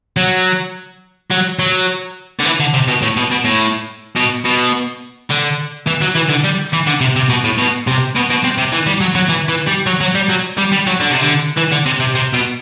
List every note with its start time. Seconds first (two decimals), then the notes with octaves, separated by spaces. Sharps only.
0.17 F#3
1.31 F#3
1.59 F#3
2.39 D3
2.45 E3
2.60 D3
2.74 C3
2.88 B2
3.02 A2
3.16 B2
3.31 B2
3.45 A2
4.16 B2
4.45 B2
5.30 D3
5.87 E3
6.01 F#3
6.16 E3
6.30 D3
6.44 G3
6.73 E3
6.87 D3
7.01 C3
7.16 C3
7.29 B2
7.44 A2
7.58 B2
7.87 C3
8.15 B2
8.30 B2
8.44 C3
8.58 C3
8.72 E3
8.87 G3
9.01 F#3
9.15 F#3
9.29 E3
9.48 E3
9.67 G3
9.86 F#3
10.01 F#3
10.15 G3
10.29 F#3
10.58 G3
10.72 G3
10.87 F#3
11.00 D3
11.11 C3
11.22 D3
11.57 E3
11.72 D3
11.86 C3
12.00 C3
12.15 C3
12.34 B2